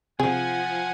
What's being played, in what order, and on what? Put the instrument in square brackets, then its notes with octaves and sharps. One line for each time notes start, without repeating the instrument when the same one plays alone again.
[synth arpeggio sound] C3 C4 [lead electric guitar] F3 [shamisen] G#4 [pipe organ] F#5 G#5